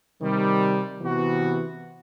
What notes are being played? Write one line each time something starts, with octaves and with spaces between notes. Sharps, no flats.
C3 D#3 G3
C3 E3 B3 F#4